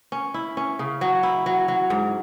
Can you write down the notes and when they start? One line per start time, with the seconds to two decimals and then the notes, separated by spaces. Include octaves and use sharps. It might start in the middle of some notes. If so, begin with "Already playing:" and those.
0.12 C#4
0.34 E4
0.57 C#4
0.79 C#3
1.01 F#3
1.23 E4
1.46 F#3
1.68 F#3
1.90 G#2